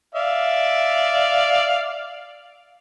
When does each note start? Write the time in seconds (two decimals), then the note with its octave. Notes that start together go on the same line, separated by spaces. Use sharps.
0.15 D5 E5 F5